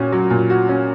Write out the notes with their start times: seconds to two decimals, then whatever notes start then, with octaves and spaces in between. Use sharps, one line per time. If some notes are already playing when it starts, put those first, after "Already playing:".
Already playing: A#2 C#4 F#4
0.12 F#3
0.30 A#2
0.50 F#4
0.69 C#4